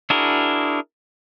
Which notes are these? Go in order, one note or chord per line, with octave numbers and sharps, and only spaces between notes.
D4 E4 F#4 G#4 A#4